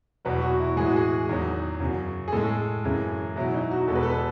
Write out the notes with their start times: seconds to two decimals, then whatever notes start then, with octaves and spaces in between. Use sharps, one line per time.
0.25 E2 B2 F#3 B4
0.42 F#4
0.60 E4
0.76 A2 E3 G#3 G#4
0.86 F#4
0.96 G#4
1.29 E2 D#3 F#3
1.80 F#2 C#3 F#3
2.28 G#4
2.32 A2 G#3 A4
2.84 F#2 C#3 E3 G#3
3.36 B2 F#3 E4
3.54 D#4
3.71 F#4
3.87 E2 B2 G#3 A4
3.96 B4
4.03 A4
4.10 B4